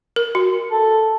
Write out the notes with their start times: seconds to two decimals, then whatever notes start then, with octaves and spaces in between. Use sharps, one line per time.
0.16 A#4
0.35 F#4
0.71 A4